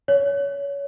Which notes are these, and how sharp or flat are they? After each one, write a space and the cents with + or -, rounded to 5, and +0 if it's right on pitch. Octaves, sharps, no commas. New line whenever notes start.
C#5 +25